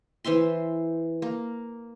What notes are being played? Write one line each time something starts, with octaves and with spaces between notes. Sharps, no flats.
E3 C5 E5 C6
A#3